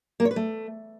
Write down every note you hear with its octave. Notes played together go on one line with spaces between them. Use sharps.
A#3
C#5
B4
A3